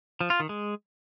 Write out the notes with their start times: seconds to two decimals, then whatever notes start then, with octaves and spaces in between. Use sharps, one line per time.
0.21 F3
0.30 F4
0.40 D#3
0.49 G#3